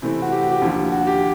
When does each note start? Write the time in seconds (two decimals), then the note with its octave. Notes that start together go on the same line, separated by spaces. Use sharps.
0.02 C3 E3 A3 C4 E4
0.22 F#4
0.32 G4
0.42 F#4
0.52 G4
0.62 D#2 D3 F3
0.92 F#4
1.07 G4